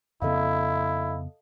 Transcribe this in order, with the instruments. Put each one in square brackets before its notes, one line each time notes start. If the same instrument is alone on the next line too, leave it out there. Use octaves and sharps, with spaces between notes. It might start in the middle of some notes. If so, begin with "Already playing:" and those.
[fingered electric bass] F2 C#3 B3 [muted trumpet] E4 [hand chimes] A4 D#5 F5